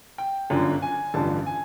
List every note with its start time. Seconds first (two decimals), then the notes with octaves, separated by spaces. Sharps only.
0.18 G5
0.50 G1 F#2 D3 F3
0.82 G#5
1.14 A1 G2 D3 F3 A5
1.46 G#5